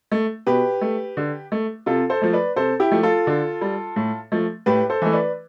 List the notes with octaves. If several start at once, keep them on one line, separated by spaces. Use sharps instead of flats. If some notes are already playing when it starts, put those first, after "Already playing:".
A3
B2 G4 B4
A3
D3
A3
C3 F4 A4
A4 C5
F3 A3
B4 D5
C3 A4 C5
E4 G4
F3 A3
F4 A4
D3
G3
A2
F3 A3
A2 G4 B4
A4 C5
E3 A3
B4 D5